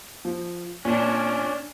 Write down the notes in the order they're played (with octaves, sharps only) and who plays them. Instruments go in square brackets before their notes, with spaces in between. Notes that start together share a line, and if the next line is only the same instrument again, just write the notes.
[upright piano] F3
[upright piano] A#2 [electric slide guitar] C#4 D4